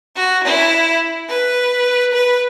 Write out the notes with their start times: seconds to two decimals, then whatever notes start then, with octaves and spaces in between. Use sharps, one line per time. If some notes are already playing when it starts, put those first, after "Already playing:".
0.16 F#4
0.43 E4
1.29 B4
2.13 B4